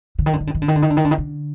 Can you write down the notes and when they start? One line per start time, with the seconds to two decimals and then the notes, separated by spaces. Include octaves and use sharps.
0.19 D3
0.26 D#3
0.33 D3
0.40 D#3
0.47 D3
0.55 D#3
0.62 D3
0.68 D#3
0.76 D3
0.82 D#3
0.90 D3
0.97 D#3
1.05 D3
1.11 D#3
1.18 D3